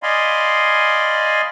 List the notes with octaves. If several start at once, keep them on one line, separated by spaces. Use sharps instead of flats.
D5 D#5 F5 G#5 B5 C6